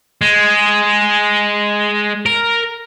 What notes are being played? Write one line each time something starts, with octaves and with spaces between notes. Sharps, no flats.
G#3
A#4